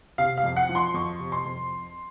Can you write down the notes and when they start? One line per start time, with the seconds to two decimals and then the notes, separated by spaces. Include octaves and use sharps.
0.18 C3 F5
0.38 F5
0.44 F2
0.56 F#5
0.69 F3
0.75 C6
0.94 F2 C#6
1.20 C3
1.32 C6
1.45 F2